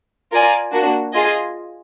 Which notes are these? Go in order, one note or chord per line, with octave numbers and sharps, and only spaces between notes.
F4 A#4 D5 G#5
A#3 D4 F#4
F4 G#4 D#5 G#5